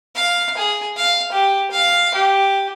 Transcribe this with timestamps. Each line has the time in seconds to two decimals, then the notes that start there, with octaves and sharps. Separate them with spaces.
0.15 F5
0.58 G#4
0.96 F5
1.32 G4
1.71 F5
2.14 G4